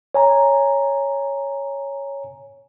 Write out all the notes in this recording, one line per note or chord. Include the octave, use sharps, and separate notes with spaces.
C#5 G#5 A#5